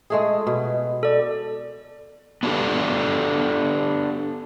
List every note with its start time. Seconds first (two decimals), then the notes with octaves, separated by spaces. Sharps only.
0.10 G#3 A3 G#4
0.47 B2
1.03 A4 D5
2.43 B3 D4 F#4 G4 A4